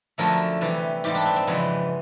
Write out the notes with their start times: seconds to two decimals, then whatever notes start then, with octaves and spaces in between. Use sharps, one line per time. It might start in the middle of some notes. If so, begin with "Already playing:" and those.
0.18 F#2 D3 F3 A3 A#4
0.61 C3 E3 G3
1.04 G#2 E3 G3 B3 G4
1.15 D4
1.25 C4
1.36 C4
1.47 F2 C#3 E3 G#3 B3